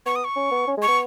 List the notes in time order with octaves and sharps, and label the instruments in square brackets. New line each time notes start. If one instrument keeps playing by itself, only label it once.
[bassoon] B3 [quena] C#6
[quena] D#6
C#6
[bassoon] C#4
B3
C#4
[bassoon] G#3 [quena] C#6
[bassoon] B3